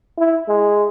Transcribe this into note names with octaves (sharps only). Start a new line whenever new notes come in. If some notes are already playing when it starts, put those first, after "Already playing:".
E4
G#3